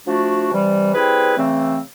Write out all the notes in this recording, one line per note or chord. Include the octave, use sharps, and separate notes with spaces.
F3 A3 D4 F#4
C3 E3 G3
G3 C4 E4 G#4 B4
C#3 E3 A3 C4